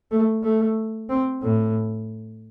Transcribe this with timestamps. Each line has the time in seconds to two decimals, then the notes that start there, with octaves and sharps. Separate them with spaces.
0.11 A3
0.43 A3
1.09 C4
1.42 A2